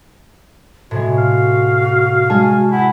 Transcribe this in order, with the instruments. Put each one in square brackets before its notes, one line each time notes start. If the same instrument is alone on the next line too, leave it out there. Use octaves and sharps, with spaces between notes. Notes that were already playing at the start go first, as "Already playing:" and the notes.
[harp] A2 C3 G#3 [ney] F#4
[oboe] F5
[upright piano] G#3 A5 [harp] G#4 G#5
[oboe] E4 [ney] F#5